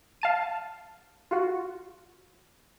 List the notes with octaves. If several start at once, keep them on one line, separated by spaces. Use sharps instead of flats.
F5 A5 D#7
F4 F#4